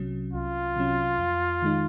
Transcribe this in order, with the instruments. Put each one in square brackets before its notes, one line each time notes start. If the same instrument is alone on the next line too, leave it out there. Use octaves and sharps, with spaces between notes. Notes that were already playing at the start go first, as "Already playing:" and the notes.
Already playing: [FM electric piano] C2 C3 F#3 C#4
[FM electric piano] C2 [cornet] F4
[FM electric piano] C3 F#3 C#4
F2
D#3 G#3 D#4